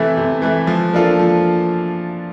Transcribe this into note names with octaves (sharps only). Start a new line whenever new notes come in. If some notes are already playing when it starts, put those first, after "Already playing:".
Already playing: C3 E3 A3 E4
C3
E3 A3 E4
F3
A#3 D4 F4 A4
F3